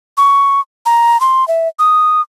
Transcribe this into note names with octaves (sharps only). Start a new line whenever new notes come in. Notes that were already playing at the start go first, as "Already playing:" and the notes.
C#6
A#5
C6
E5
D#6